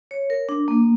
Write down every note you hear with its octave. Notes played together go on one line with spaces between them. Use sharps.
C#5
A#4
D4
A#3